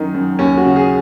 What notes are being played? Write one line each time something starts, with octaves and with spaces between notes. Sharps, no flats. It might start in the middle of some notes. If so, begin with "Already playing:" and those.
Already playing: F#2 D#3 D#4
F#2
D#2 C#4
F#4
C#3
G#4